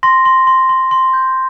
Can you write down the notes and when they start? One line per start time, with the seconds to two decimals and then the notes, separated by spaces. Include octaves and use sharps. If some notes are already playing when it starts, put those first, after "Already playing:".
0.03 C6 A#6
0.25 C6
0.47 C6
0.69 C6
0.91 C6
1.13 G6